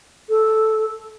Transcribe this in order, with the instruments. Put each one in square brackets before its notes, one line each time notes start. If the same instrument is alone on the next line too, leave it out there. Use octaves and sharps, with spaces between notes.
[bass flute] A4